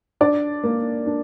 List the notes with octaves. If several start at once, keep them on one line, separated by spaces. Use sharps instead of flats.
D4 D5
A#3
D4